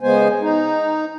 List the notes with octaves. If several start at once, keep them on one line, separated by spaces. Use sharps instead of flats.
C#3 G#3 B3 C5 G#5
D#4